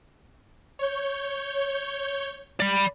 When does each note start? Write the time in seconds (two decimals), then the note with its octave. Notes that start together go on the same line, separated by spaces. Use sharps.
0.79 C#5 G6
2.60 D5 B5